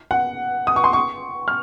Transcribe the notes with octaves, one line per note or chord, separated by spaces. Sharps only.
F#5
D#6
C#6
C6
C#6
F6